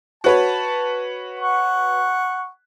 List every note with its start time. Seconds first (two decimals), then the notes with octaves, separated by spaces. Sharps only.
0.24 F#4 B4 C#5 A5
1.40 F#5 C#6